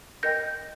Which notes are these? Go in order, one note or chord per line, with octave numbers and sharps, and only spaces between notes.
A#4 D#5 G5 G6 A#6